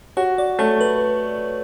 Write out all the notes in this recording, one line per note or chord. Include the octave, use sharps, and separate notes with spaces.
F#4 C#5
D5
A3 C#5
B4